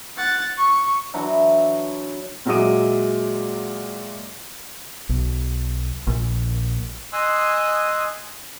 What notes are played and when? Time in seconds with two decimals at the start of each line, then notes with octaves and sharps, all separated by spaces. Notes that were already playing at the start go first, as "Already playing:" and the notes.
0.17 F#5 A6
0.58 C#6
1.14 E3 F#3 D4 E4
2.46 A#2 F#3 G#3 E5 D6 D#7
5.09 B1
6.07 A#1
7.13 D#5 G#5 C6 D#6 E6 F#6